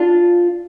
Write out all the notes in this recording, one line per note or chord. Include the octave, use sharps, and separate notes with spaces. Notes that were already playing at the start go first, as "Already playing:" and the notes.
Already playing: D4 F4